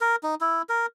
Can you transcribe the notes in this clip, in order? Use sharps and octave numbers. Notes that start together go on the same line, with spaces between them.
A#4
D#4
E4
A#4